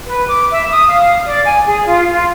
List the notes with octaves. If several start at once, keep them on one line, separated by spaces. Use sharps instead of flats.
B4
D6
E5
D#6
F5
D5
G#5
G#4
F4
F4